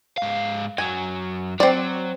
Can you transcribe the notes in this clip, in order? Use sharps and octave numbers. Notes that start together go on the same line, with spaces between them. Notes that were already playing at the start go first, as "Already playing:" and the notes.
G#2 F5
F#2 F#3 G#5
F#3 C4 D5